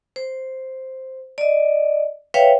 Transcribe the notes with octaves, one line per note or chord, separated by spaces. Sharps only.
C5
D5 D#5
B4 C#5 E5 F5 G5